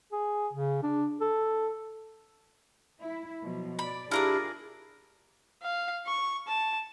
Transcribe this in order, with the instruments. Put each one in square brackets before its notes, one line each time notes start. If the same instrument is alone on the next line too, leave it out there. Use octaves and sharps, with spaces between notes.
[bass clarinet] G#4
C#3
D4
A4
[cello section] E4
B2 F3 F#3
[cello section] D5 [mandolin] B5
[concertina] D4 E4 [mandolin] F4 A#4 D5 [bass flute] G4 [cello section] G#4
[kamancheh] F5
C#6
A5